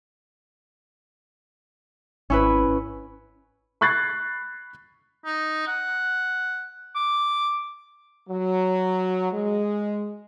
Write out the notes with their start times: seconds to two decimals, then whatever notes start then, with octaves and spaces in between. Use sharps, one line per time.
2.30 G#1 C#4 E4 B4
3.81 B5 C#6 F#6 G#6 A6 C7
5.25 D#4
5.67 F#5
6.95 D6
8.29 F#3
9.32 G#3